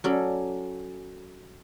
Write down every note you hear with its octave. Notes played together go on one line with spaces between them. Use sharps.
F#3 C#4 A4 D5